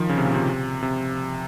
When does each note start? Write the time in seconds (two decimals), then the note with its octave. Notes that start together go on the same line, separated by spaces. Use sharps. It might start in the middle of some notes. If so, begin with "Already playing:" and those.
Already playing: D#3 F3
0.09 C#3
0.18 C3
0.25 A#2
0.34 C3
0.83 C3